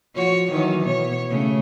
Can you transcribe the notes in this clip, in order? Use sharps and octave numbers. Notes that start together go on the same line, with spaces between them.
F3 F#4 C#5
D#3 E3 F#3
B2 C#5
C#3 A3